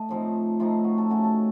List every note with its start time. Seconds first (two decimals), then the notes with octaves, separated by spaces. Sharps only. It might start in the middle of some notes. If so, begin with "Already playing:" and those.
Already playing: A3 D#5
0.09 A2 F3 C4 D#4
0.60 A2 F3 C4 D#4 F4
0.84 F#4
0.98 A4
1.10 C#3 A3 C#4 F#4
1.24 A4